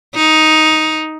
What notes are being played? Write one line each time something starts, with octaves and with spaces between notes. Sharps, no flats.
D#4